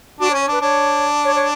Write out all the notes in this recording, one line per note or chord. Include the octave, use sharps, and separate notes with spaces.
D4 F#4
C#5
C#4
C#5
D4 B4
D4 C#5
C#5
C#5